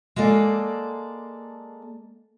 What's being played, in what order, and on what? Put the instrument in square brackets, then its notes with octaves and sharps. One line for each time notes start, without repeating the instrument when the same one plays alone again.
[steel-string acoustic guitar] G#3 A#3 A4 D5